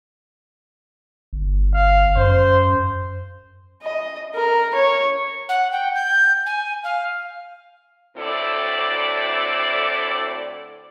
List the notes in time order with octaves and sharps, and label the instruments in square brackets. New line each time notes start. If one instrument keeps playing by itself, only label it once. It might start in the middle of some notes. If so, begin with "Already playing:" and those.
[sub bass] G1
[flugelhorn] F5
[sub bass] F#2 [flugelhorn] C5
[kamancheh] D#5
A#4
C#5
[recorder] F#5
G5
G6
G#5
F5
[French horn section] D2 A2 C4 E4 A4 D5